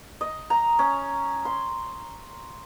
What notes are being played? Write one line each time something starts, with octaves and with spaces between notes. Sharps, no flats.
D#5
A#5
C#4
C6